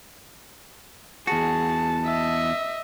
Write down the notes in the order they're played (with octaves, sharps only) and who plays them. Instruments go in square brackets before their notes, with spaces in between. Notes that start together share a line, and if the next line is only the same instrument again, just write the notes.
[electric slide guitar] E2 F#4 [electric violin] G#4 [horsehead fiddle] A5
[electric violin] D#5 E5